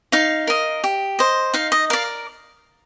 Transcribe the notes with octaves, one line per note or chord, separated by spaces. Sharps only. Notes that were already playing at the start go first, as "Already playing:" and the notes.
D#4 F5
A#4 D#5
G4
C5 D#5
D#4 F5
D#5
A#4 D5 F5